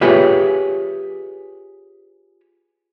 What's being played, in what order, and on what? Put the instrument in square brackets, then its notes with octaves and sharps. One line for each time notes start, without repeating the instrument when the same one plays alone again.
[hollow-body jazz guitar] F4 G4 G#4 B4 C#5 E5